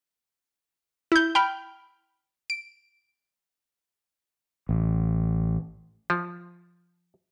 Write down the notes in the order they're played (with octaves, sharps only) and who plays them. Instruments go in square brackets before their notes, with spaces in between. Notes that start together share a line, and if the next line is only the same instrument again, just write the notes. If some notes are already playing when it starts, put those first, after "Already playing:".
[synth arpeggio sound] E4 G6
G5 B5 F6
D7
[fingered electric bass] A1
[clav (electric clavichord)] F3